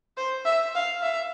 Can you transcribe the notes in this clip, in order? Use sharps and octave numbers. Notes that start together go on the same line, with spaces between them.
C5
E5
F5
E5